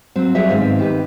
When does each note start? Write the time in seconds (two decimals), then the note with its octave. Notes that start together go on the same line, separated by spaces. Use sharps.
0.16 F#3 C4
0.35 F#3 G3 G#4 E5
0.49 G#2 D#3 B3 C4 F5
0.79 D#3 G4 B4